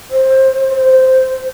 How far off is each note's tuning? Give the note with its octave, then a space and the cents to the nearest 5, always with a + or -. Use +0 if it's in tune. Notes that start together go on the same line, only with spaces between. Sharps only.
C5 +15
C5 -10